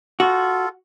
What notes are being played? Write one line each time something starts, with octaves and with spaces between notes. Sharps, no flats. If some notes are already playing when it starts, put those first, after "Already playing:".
F4 F#4 A4